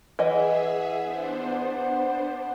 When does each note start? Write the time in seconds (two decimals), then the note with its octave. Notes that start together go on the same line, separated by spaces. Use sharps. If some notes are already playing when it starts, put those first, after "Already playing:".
0.19 E3 G#4 D#5 E5 F#5
1.01 B3 D4 C5